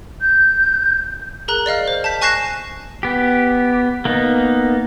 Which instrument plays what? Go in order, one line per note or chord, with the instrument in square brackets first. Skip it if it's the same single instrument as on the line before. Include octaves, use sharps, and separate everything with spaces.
[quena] G6
[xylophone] G#4 A#4 A#5 F#6
D5 D#5 F5 F6
C5
A5 G6 B6
G#5 C#6 F#6 A#6 C7 E7
[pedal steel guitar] B3 G4
A#3 B3 D#4